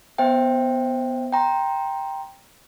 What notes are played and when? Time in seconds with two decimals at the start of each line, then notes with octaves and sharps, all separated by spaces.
0.18 B3 C5 E5 G5
1.32 G5 A#5 C6